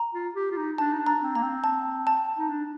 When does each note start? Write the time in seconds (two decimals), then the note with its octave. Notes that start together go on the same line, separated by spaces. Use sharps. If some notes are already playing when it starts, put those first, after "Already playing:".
Already playing: A#5
0.14 F4
0.35 G4
0.52 F4
0.57 D#4
0.78 D4 A5
0.93 D#4
0.99 D4
1.06 A#5
1.22 C4
1.35 A#3 A#5
1.43 C4
1.64 A5
2.07 A5
2.38 D#4
2.49 D4